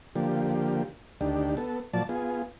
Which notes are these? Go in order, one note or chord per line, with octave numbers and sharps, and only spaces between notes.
D3 F3 A#3 G4
D2 D#3 D4 G4
B3 A4
A#2 F3 F#3 D5 A5
B3 F4 G#4